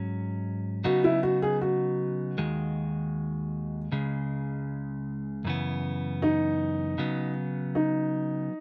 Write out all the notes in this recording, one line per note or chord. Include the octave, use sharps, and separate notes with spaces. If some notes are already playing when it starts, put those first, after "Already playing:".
Already playing: G#2 F#3 C#4
C#3 F#3 B3 D#4 F#4
E4
F#4
G#4
F#4
D#2 D#3 G#3
C#2 C#3 G#3
F#2 C#3 E3 B3
D#4
C#3 F#3 B3
D#4